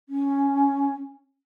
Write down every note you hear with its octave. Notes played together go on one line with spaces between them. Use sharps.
C#4